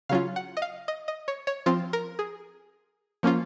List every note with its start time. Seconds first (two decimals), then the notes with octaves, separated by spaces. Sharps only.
0.09 C#3 F#3 C#4 F4 F5
0.36 F#5
0.57 D#5
0.62 F5
0.88 D#5
1.08 D#5
1.28 C#5
1.47 C#5
1.66 F3 C4 F4 C5
1.93 A#4
2.19 G#4
3.23 F3 A#3 C#4 F4